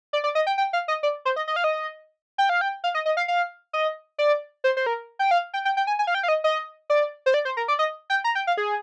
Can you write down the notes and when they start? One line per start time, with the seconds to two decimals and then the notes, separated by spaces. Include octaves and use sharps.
0.13 D5
0.24 D5
0.35 D#5
0.47 G5
0.58 G5
0.73 F5
0.88 D#5
1.03 D5
1.25 C5
1.36 D#5
1.48 D#5
1.56 F5
1.64 D#5
2.38 G5
2.49 F5
2.61 G5
2.84 F5
2.95 D#5
3.06 D#5
3.17 F5
3.28 F5
3.73 D#5
4.18 D5
4.64 C5
4.77 C5
4.86 A#4
5.19 G5
5.31 F5
5.54 G5
5.65 G5
5.77 G5
5.87 G#5
5.99 G#5
6.07 F5
6.14 G5
6.23 F5
6.28 D#5
6.44 D#5
6.90 D5
7.26 C5
7.34 D5
7.45 C5
7.57 A#4
7.68 D5
7.79 D#5
8.10 G5
8.24 A#5
8.35 G5
8.47 F5
8.57 G#4